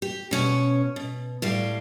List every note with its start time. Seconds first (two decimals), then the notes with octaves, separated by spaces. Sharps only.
0.02 G4
0.31 B2 C#4 C#5
0.96 B2
1.42 A2 G3 F5